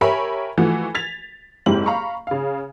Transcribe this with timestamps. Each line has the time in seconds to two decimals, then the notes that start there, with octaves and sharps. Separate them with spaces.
0.01 G4 A#4 C#5 E5 G#5 B5
0.58 E3 F3 A3 F#4
0.95 G#6 A6 B6 F7
1.66 F#1 G#2 C4 E4 G4 F#7
1.86 F5 A#5 B5 C#6
2.27 C#3 F5